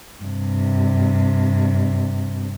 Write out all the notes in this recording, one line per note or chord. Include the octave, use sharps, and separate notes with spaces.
G2 C3